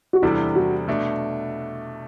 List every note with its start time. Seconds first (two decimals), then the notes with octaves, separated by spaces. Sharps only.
0.13 F#4
0.22 E2 C3 G3 D4 E4 A4
0.56 F#4
0.88 B2 A3 D4